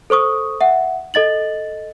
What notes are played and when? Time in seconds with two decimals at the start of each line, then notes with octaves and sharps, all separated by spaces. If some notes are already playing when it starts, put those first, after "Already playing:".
0.10 A4 C5 C#6 D#6
0.61 E5 F#5
1.14 A4 D#5 A6 F#7